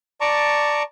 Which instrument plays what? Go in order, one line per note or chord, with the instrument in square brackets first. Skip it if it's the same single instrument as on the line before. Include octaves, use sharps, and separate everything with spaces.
[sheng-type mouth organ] D5 A5 A#5 C#6 D6